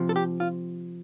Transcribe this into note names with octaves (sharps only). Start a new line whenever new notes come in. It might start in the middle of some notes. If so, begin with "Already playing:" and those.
Already playing: C3 F3
A4
G4
F4